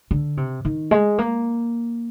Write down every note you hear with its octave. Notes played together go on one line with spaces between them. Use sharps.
D3
C3
D#3
G#3
A#3